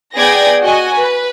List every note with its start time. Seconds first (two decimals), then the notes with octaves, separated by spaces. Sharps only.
0.16 B3 G#4 D5 G5 G#6 A#6
0.61 F#4 D#5 G#5
0.93 B4